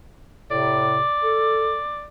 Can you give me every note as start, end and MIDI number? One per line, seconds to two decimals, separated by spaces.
0.51 1.02 45
0.51 1.02 48
0.51 2.07 74
1.23 1.76 69